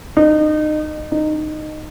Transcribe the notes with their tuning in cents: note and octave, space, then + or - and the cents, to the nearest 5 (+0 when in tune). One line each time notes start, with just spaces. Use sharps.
D#4 -30
D#4 -20